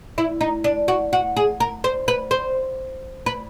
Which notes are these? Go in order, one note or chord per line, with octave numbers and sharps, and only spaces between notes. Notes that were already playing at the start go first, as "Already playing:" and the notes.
E4
D#4
D4
F#4
F#4
G#4
A#4
C5
B4
C5
B4